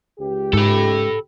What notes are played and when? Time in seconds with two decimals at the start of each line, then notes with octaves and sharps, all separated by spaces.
0.19 C#2 G4
0.53 G#2 A4 B5